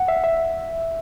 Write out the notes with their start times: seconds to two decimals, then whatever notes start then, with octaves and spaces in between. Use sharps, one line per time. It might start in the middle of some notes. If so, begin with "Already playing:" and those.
Already playing: F#5
0.08 E5
0.24 E5